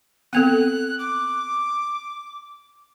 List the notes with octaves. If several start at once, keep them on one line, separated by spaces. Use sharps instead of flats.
B3 C4 A4 F#6
D6